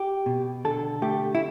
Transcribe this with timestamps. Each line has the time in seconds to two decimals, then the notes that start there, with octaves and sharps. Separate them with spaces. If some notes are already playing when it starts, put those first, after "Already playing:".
Already playing: G4
0.26 B2
0.65 D3 A4
1.02 A3 G4
1.35 E4